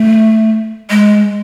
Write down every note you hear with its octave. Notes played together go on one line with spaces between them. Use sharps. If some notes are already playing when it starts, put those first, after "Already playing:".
Already playing: A3
G#3